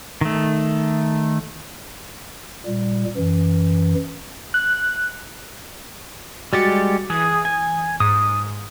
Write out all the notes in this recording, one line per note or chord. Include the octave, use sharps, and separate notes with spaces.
D#3 A3
A#2 G3
F#2 E3
F#6
G3 G#3 F#4 G4 A6 C#7
E3 G#4 D#6
G#5
G#2 D#6